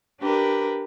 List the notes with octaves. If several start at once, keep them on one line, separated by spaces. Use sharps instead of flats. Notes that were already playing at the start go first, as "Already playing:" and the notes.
D4 G4 A#4 B4